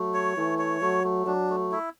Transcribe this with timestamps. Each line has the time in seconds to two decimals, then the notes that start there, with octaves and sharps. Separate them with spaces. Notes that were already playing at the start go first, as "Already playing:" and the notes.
Already playing: F#3 A3
0.14 C#5
0.37 E3 A3
0.59 C#5
0.81 F#3 A3
1.04 A3
1.26 F#3 D4
1.50 A3
1.72 E4